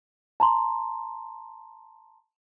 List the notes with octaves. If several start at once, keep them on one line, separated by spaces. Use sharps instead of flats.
A5 A#5 C6